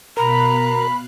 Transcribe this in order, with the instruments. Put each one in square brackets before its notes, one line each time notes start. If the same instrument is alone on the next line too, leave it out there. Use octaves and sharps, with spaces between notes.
[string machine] B2 F5 F#6 [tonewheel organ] A#4 [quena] A#5 [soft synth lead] B5